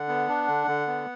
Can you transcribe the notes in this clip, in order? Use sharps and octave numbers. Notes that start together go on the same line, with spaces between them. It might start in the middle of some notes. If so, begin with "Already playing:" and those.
Already playing: D3 F#5
B3
D4
D3
D3
B3